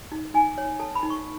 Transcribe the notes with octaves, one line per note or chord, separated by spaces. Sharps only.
D#4
D#4 G#5
C#5
A4 A5
B5
D#4
C#6